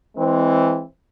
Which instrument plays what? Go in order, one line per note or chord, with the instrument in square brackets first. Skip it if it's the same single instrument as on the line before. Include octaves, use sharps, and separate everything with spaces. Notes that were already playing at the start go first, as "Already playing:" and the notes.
[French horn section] E3 G#3 C4